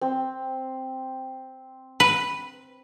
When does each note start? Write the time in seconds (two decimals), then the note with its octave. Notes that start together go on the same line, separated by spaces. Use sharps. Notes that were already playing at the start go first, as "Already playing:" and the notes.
0.01 C4 E6
2.00 B4